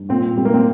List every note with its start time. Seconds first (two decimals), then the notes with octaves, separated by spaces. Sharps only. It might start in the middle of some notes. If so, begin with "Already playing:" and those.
Already playing: G2
0.09 A#2 C4
0.36 G3 C4
0.45 A#3
0.54 C4